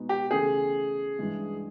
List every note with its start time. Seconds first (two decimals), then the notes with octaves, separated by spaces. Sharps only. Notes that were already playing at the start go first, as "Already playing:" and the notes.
Already playing: B2 G#3 B3 D#4 F#4
0.09 G4
0.31 C#3 E3 A3 G#4
1.19 G2 E3 G#3